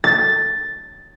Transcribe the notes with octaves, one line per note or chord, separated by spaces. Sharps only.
A6